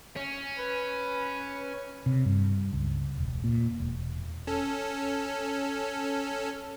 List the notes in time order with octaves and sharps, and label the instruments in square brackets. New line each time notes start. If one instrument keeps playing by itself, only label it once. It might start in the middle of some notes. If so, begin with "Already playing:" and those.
[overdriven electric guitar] C#4
[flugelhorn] B4
[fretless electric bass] C3
G2
C#2
E1
A#2
E1
[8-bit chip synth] C#4 A4